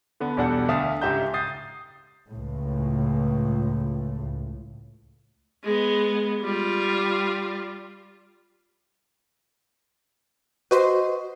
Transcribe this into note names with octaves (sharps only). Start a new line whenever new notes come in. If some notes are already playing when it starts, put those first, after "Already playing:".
D3 B3
B1 E2 G3 D4 A4 F#5
D2 E5 F5 D#6 A6
C#2 G#2 G4 E5 A#5 G6
D#6 G6 A6 C7
C#2 A2
G#3 B3
G3 F4
F#4 B4 C5 D#5 C6